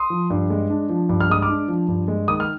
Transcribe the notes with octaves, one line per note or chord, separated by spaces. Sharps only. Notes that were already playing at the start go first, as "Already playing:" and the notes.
Already playing: C6 D#6
F3
G2
G#3
D4
F3
G2
F6
G#3 D#6
D6 F6
D4
F3
G2
G#3
D#3 D#6
F6